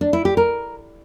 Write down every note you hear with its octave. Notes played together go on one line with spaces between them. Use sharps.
D4
E4
G4
A#4